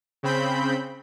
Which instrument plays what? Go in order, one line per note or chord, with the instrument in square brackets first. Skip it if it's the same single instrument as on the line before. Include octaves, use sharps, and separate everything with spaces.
[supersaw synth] C#3 C4 B5 G6